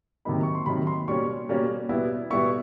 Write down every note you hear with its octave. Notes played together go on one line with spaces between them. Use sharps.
C3 D#3 F#3 A#3 D#4 B5
C#6
C6
C3 D#3 F#3 A#3 D#4 B5
C6
B2 G3 A#3 C#4 C#6
B2 G3 A#3 C#4
B2 G3 B3 E4
B2 G3 B3 E4 C#6